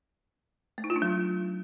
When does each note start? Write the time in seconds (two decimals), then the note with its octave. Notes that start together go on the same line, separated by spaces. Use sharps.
0.78 A3
0.84 D#4
0.90 F4
0.96 D4
1.02 F#3